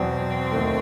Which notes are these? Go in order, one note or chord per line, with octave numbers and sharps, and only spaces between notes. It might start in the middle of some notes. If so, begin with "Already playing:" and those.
Already playing: E2 B2 F#3 C4
D#2 D#3 A3